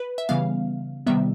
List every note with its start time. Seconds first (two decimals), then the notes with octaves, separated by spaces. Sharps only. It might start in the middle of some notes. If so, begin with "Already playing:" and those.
Already playing: B4
0.18 E5
0.29 C#3 E3 G3 B3 F5
1.06 C3 D#3 G3 B3 E5